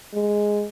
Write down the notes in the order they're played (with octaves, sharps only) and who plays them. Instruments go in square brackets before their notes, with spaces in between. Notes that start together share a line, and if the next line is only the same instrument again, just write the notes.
[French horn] G#3